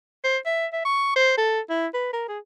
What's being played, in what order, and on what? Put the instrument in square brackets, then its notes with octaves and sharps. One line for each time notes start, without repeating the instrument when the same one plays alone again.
[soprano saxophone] C5
E5
E5
C#6
C5
A4
E4
B4
A#4
G#4